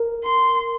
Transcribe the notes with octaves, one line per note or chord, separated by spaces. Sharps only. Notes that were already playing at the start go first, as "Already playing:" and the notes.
Already playing: A#4
C6